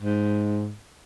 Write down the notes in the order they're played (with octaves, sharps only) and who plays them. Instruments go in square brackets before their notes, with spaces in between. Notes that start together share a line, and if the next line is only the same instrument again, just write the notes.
[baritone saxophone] G#2